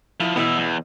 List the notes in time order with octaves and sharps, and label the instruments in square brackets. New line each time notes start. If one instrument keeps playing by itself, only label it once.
[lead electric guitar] F3 [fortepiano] E4
[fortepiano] B2 E3 [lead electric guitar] B3 E5
[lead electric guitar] E2